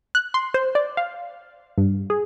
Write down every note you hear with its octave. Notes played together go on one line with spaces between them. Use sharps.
F#6
C6
C5
D5
F5
G2
G#4